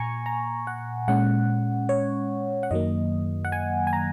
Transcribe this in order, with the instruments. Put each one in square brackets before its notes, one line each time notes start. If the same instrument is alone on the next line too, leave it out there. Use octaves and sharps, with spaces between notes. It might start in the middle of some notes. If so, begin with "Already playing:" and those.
Already playing: [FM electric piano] A#2 G#5 A#5 C#6
A#5
F#5
A#2 G#3 C#4 F#5
C#5
F#5
F#2 D#3 F#3 A#3 D#5
F#5
G#5
G#5
A#5